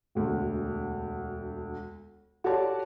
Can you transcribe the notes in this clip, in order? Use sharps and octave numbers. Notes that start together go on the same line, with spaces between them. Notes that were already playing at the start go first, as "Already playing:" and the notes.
E1 D2
F#4 G4 A4 C#5 D5 A5